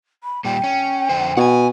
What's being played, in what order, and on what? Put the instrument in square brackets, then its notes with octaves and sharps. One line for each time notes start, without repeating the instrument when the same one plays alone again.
[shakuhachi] B5
[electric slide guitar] A#2 G3 [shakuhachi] G5
[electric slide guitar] C#4
F2 D3 C5
[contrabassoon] B2 [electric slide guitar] F#5 G#5